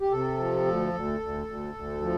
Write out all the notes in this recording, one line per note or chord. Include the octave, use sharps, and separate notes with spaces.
G4
C3 A4
F3
D2
D2
D2
D2
D2
F3